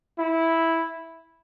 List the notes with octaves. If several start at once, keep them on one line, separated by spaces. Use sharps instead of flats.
E4